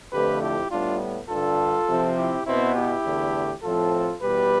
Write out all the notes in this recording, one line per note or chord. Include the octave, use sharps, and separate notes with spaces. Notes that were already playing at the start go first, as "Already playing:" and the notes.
F2 D3 F3 A3 G4 B4
E4 G4
A2 G3 B3 D4 F4
G2 D3 G3 F4 A4
C3 F3 C4
E4 G4
B2 B3 C4 E4
E4 G4
E2 D3 A3
A2 F3 C4 F4 A4
E2 B2 G3 G4 B4